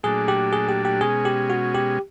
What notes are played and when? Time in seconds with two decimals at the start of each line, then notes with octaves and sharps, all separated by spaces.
0.03 A#2 F#3 A3 D4 G#4
0.28 G4
0.53 G#4
0.69 G4
0.85 G4
1.01 B2 G#3 C#4 G#4
1.25 G4
1.50 F#4
1.74 G4